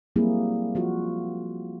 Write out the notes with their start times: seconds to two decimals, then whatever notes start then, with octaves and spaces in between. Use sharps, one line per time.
0.16 F#3 G3 A#3 C4 E4 G#4
0.75 F3 F4 F#4